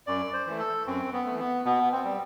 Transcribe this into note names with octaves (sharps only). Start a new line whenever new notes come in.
F#2 D5
C5
E3 A3
A4
F#2 C4
B3
E3 A3
B3
B2 B3
C4
G3